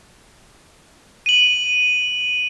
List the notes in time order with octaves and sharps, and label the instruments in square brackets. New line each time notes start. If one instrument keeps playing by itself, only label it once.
[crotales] D#7 F#7